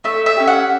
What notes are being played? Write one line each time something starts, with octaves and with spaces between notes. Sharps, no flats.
A3 E5
E5
C#4 G4
F#5